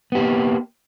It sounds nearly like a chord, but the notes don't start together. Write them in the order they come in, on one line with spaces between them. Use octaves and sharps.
B3 G4 A#3